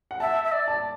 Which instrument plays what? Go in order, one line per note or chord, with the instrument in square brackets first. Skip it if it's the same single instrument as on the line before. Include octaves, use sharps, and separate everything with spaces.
[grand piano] F#5
[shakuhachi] E5 [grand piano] A5
[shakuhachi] E5
D5
[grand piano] A5